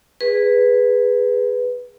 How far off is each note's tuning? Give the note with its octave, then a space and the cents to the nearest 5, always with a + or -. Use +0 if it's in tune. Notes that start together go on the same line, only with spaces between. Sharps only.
G#4 -10 B4 +0